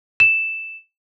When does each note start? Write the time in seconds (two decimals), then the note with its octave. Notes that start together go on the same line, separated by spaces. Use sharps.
0.20 E7